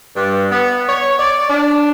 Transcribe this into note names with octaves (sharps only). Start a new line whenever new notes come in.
G2
B3
C#5
D5
D4